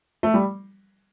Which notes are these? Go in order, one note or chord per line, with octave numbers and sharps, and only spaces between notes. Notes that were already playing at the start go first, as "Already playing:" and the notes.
A3
G3